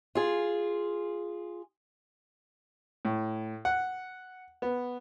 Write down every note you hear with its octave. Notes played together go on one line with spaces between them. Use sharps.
F4 G#4
A2
F#5
B3